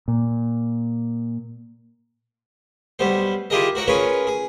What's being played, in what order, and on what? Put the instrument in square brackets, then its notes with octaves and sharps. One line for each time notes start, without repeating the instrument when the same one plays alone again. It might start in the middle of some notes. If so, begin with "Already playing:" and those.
[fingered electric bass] A#2
[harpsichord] B1 G3 B3 C5
E4 F4 G4 G#4 A#4 D#5
F#4 A#4 C#5 F#5
C#4 F4 G#4 A#4 B4 C#5
G#4